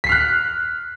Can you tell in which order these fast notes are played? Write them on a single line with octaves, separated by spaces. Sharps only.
B6 C7 F6 F#6